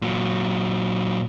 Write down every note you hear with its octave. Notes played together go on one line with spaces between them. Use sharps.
A#2 F#3